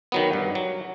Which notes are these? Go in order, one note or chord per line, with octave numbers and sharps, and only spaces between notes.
D#3 F#3 B3
G2
F#3